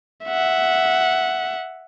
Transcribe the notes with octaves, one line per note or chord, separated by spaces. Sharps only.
E5 F#5